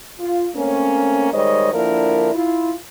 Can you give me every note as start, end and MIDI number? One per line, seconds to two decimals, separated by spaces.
0.20 0.48 65
0.56 1.32 57
0.56 1.32 58
0.56 1.32 60
0.56 1.32 61
1.33 1.73 51
1.33 1.73 55
1.33 1.73 56
1.33 1.73 72
1.33 1.73 73
1.33 1.73 75
1.73 2.31 50
1.73 2.31 53
1.73 2.31 58
1.73 2.31 62
1.73 2.31 64
1.73 2.31 70
2.34 2.73 64
2.34 2.73 65